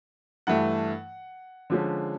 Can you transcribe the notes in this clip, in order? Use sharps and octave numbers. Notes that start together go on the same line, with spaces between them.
G2 E3 A3 F#5
D3 F3 G#3 C#4